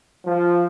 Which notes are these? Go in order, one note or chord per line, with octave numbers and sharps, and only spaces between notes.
F3